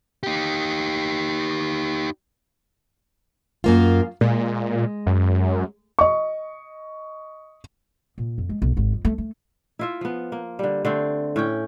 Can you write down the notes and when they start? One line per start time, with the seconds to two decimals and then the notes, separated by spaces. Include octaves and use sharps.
0.23 D#4 G4
3.64 F#2 A#3 F4
4.21 A#2 G#3
5.06 F#2
5.99 D#5 C#6
8.18 A#2
8.38 F2
8.49 G#3
8.62 B1
8.77 G#1
8.93 F2
9.05 A3
9.18 A3
9.79 E4 F4 E5
10.01 F3 B3
10.32 A#3
10.59 D3 G3
10.85 D3 A3 C4
11.36 A2 C#4 G5